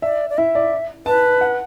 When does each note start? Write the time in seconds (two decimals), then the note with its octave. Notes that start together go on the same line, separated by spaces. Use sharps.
0.02 D5 E5
0.30 D5
0.38 E4 E5
0.55 D5
1.06 B4 A5
1.41 F#5